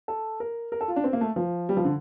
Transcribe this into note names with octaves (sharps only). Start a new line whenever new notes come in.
A4
A#4
A#4
A4
F4
D4
C4
A#3
A3
F3
G3
F3
D3